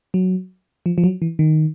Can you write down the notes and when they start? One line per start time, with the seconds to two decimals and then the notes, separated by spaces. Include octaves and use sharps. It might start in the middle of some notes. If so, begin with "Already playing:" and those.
0.14 F#3
0.86 F3
0.98 F3
1.04 F#3
1.22 E3
1.39 D#3